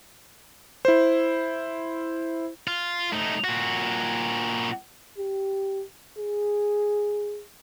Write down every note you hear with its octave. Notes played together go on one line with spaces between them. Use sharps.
E4 C5
F4
A3 D#4
A#2 F#4
G4
G#4